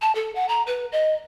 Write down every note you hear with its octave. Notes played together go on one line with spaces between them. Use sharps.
A5
A4
F#5
A#5
B4
D#5